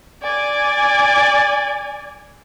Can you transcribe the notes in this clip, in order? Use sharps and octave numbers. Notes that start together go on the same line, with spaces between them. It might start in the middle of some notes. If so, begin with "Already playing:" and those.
D5 G#5